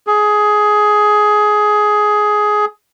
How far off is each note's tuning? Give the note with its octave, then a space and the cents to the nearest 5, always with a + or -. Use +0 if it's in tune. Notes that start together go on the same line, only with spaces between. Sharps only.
G#4 +15